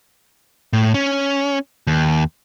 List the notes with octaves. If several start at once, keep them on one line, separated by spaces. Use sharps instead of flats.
A2
C#4
D#2